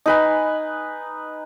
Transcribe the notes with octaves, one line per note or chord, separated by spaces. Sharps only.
D#4 B4 G#5